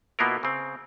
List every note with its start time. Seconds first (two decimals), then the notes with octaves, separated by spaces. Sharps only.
0.19 B2 A#3 B3 E4 F4 A#4
0.43 C#3 C4